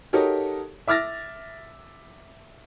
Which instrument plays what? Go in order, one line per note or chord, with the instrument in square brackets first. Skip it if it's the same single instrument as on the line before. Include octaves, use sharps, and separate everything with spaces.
[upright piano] D#4 F#4 G4 A4 A#4 C#5
E5 D6 F6 A6 A#6